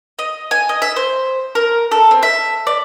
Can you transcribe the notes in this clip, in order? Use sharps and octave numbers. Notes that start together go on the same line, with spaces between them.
D#5
G#5
D#5
E5
C5
A#4
A4
C4
E5
D5